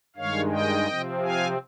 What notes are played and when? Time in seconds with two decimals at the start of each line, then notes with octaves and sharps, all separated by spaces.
0.16 G2 D#3 G#3 C#5 F5
0.52 D#5 G5
0.88 C3 F3 C4
1.23 F5 G#5